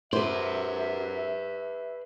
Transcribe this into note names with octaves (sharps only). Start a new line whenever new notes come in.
F#2 B4 C5 D5 E5